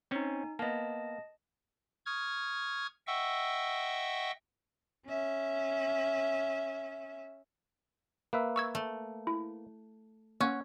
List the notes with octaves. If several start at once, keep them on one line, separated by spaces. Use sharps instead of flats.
C4 C#4 D#4 G#5
A#3 B3 D#5 A5
C#6 D#6 F6 G#6
D#5 E5 F#5 G5 C#6 E6
C#4 E5
A#3 B4 E5
C#6 E6 G#6
A3
E4
A#3 C#4 C#5 F#5 C#6